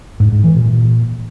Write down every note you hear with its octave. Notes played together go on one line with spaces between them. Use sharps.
G#2
G#2
E3
A#2